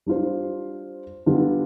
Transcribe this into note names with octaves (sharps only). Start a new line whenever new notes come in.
G3 D4 F4 C5
D3 G3 B3 D4 F4